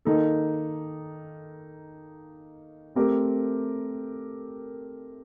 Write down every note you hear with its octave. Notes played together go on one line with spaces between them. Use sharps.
D#3 A#3 D#4 A4
A3 C4 G4 A#4